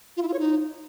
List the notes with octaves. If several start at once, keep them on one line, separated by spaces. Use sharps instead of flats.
F4
E4
F4
C#5
D#4